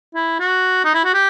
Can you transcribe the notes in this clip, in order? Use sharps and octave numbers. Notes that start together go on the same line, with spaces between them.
E4
F#4
D#4
E4
F#4
G4